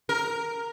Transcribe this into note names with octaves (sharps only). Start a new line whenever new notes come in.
A#4